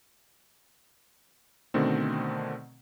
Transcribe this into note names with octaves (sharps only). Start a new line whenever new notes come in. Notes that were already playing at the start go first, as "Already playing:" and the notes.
B2 D3 D#3 A3 C4